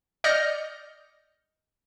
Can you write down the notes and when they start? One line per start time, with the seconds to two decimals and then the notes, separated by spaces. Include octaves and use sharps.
0.24 D5 D#5 F6 G6 A#6 C#7